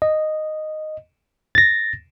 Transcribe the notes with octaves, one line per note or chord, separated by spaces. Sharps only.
D#5
A6 A#6